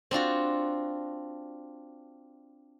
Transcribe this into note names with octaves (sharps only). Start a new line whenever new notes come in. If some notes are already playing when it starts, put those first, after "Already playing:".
C4 D4 F4 F#4